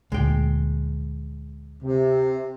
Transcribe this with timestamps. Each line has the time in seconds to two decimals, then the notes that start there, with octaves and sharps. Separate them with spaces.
0.12 D2 A#2 G#3 G5
1.82 C3